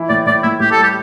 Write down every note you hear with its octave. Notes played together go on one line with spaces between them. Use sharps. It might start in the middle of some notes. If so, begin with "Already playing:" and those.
Already playing: E3 E4
A2 D5
A2 D5
A2 E4
A2 G4
A4
G3
G4